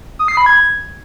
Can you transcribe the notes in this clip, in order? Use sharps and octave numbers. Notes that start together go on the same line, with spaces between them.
D#6
C7
B5
G#6